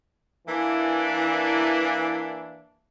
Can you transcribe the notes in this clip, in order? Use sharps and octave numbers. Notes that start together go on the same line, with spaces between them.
E3 A#3 D4